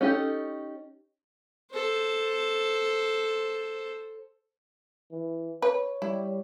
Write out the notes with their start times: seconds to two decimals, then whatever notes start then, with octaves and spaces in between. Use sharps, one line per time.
0.01 C#4 D#4 F4 G4 A4
1.72 A4 C5
5.12 E3
5.62 B4 C#5
6.02 G3 E4